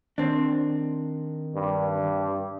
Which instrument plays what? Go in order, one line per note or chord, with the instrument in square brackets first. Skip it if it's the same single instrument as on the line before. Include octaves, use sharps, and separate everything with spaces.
[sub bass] D#3 [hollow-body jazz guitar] C4 D4
[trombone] G2